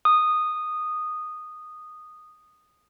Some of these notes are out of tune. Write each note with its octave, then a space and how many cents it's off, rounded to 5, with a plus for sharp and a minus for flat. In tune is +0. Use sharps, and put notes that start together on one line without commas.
D#6 -10